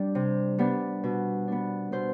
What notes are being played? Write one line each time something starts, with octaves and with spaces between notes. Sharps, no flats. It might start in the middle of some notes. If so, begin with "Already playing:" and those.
Already playing: G3 D4
C3
G3 B3 D4
B2
B3 D4
B2 C5